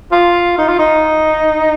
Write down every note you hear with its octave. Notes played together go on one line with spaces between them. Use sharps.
F4
D#4
F4
D#4